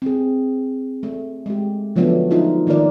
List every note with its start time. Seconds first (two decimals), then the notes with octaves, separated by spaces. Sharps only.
0.02 C4 G#4
1.03 A3
1.46 G#3 G4
1.96 D3 F3 F#3 A3 B3 D4
2.30 D4 D#4 F4 A4
2.67 D#3 A#3 F4 A#4 D5